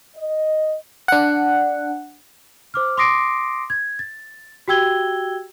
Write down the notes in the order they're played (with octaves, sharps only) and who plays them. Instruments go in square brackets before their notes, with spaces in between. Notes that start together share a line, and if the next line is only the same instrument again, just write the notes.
[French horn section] D#5
[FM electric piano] D4 F#5
[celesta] C5 D6 F6
C6 D6 D#6 A#6 C7 D7
G#6
A6
F#4 G4 G5 E6 G#6 G7